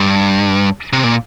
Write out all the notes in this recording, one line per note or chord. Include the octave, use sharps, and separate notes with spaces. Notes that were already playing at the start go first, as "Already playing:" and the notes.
Already playing: G2
C3
A#2